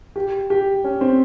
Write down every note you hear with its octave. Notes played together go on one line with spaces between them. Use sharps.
G4
G4
C#4
C4